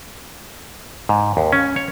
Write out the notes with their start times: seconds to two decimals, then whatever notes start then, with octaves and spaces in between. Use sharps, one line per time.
1.09 G#2
1.37 D#2
1.53 C#4
1.76 C#5